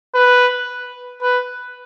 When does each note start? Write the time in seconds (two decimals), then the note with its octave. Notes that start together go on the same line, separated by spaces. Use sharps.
0.15 B4
1.22 B4